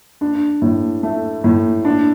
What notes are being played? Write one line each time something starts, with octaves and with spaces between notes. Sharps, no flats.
D4
A2
A3
A2
D4